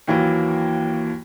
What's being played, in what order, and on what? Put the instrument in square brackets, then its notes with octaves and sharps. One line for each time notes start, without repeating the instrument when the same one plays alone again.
[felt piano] D#2 E3 F#3 A#3